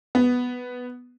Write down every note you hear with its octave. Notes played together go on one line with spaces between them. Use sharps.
B3